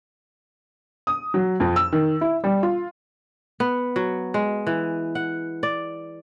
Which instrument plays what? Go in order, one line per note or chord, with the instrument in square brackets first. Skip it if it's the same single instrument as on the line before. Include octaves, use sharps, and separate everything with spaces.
[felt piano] D#6
F#3
F2
E6
D#3
E4
G3
F4
[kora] B3
F#3
G#3
E3
F#5
D5